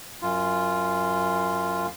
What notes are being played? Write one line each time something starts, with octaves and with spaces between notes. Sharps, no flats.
F#2 F4